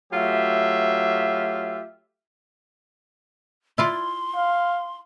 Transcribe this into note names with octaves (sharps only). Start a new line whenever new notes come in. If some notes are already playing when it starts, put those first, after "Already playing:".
F#3 A3 F4 G4 E5
E4 F4 D5 C6
F5